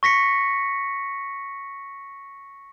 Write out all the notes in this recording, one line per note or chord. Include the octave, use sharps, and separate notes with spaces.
C#6 A#6 B6 C#7